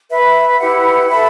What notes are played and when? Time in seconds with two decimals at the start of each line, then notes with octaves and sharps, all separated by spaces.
0.10 B4 E5 B5
0.58 E4 G4 B4 F#5
1.08 A4 E5 B5